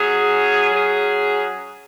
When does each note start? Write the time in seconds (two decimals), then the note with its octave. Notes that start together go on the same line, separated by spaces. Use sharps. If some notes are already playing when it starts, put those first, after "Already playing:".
Already playing: F#3 C#4 G#4
0.71 F#3 C#4 G#4